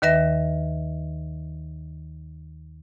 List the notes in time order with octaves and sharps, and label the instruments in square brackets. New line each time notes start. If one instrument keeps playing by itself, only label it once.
[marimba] D#2 D#3 B4 E5 A#6